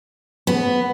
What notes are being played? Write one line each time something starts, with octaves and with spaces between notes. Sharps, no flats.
B3